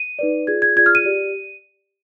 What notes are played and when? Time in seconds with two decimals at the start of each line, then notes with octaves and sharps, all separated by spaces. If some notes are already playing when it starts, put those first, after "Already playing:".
Already playing: D#7
0.19 D#4 B4 D5
0.47 F4 G#4 D5 G#6
0.62 G#6
0.76 F4 G#4 D5 G#6
0.86 F6
0.95 D#7
1.05 G4 D5